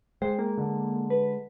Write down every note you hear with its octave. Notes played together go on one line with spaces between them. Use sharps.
G#3 C5 G5
A#3
D3
B4